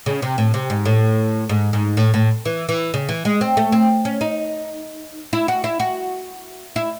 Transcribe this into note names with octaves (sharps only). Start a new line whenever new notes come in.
C#3
C3
A2
C3
G#2
A2
G#2
G#2
A2
A2
E3
E3
C#3
E3
G#3
C4
A3
C4
C#4
D#4
E4
F#4
E4
F#4
E4